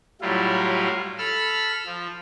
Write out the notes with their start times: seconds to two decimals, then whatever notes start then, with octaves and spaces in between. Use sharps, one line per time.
0.21 A2 F#3 G3 E4 F4
1.18 A4 B5 E6 F6
1.86 F3